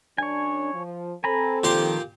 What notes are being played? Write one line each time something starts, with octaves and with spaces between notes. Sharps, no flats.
F#2 C#4 D4 C#5 G#5
F3
C4 A4 G#5 A#5 B5
A#2 D#3 F3 G4 C6